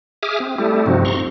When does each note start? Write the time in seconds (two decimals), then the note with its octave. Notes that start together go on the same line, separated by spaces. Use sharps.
0.23 G#4 E5 D6 D#6 F6
0.40 C4
0.58 G3 A3 E4 G4 A4
0.86 G2 C3 F3 C4 D#4 F#4
1.05 A#5 C6 C#6